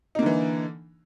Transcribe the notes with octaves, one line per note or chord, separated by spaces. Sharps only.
D3 E3 A#3 D#4